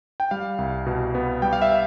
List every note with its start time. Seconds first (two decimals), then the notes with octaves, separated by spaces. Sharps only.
0.20 G5
0.31 G3 F5
0.58 C2
0.86 B2
1.15 B3
1.42 G3 G5
1.53 F5
1.62 E5
1.71 F5